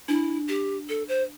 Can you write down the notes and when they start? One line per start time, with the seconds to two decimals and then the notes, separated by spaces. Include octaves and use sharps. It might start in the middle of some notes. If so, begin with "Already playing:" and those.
0.08 D4 E4
0.49 G4
0.89 A4
1.08 C5